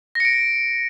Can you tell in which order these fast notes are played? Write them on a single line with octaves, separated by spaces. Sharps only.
A#6 C#7 D7